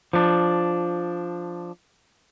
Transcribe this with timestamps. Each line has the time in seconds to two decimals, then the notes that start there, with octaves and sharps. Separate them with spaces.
0.13 F3 D4